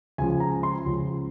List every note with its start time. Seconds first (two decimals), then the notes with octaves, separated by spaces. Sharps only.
0.18 C#2 C#3 F3 G#5
0.40 A#5
0.63 C6
0.86 C#2 C#3 F3